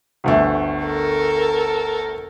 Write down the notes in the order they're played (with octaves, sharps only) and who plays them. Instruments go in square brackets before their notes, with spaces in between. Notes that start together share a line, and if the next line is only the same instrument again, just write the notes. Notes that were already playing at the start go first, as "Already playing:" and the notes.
[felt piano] G1 D2 A3
[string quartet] A4 A#4